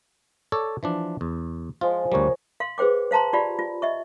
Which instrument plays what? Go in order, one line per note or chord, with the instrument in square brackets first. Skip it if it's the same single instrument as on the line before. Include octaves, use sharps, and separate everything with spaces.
[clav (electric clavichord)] A4 C#5 D5
E3 F3 D4
E2
[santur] F3 G#3 [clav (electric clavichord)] F4
[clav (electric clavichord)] D2 G3 [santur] A#4 C#5
[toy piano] F5 C6
G#4 B4 C5 G5 D6
C5 F5 A5 A#5 C6
F4 G4 D5 F5 B5
F4
D#5 E5 C#6